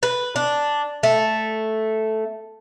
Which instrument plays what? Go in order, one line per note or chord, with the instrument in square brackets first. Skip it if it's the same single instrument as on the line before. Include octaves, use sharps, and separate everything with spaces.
[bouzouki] B4
D4
A3